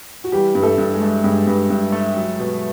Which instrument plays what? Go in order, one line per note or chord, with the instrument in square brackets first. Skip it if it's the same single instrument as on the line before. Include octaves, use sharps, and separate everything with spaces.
[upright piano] F#4
[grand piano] E3 [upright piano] G3 G4
[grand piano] G2
[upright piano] A3 A4
[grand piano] G2
[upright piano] G#3 G#4
[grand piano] A3
[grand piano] G2 [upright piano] G#3 G#4
[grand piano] G2
G2
A3
F#3
B2